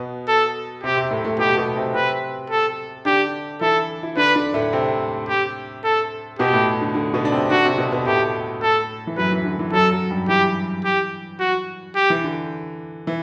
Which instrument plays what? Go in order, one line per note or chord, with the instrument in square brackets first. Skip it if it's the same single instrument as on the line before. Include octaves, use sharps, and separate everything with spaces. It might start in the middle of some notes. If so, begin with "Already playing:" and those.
Already playing: [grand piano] B2 B3
[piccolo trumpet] A4
[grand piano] C3 C4 [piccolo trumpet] G4
[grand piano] C3 C4
A2 A3
A2 A3
[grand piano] B2 B3 [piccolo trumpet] G4
[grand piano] B2 B3
C3 C4
[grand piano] C3 C4 [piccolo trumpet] B4
[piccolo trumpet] A4
[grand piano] D3 D4 [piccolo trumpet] G4
[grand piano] E3 E4 [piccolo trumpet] A4
[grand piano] E4
[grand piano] D3 D4 [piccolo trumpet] B4
[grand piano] D3 D4
A2 A3
C3 C4
[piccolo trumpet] G4
A4
[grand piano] B2 B3 [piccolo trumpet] G4
[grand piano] A2 A3
D3
D3
B2 B3
D4
C3 C4
[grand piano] D3 D4 [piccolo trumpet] F#4
[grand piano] C3 C4
B2 B3
B2 B3
[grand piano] A2 A3 [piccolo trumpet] G4
[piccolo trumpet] A4
[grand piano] E3
[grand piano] F#2 F#3 [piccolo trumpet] B4
[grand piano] E3
D3
E3
[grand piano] F#2 F#3 [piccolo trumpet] A4
[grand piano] F#2 F#3
G2 G3
[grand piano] E3 [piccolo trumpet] G4
[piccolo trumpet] G4
F#4
G4
[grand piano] E3
D3
E3